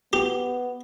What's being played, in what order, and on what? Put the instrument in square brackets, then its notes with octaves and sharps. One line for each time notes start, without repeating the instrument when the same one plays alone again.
[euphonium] B3 [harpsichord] G4